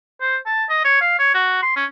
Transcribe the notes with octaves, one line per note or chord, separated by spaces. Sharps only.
C5
A5
D#5
C#5
F5
C#5
F#4
C6
C#4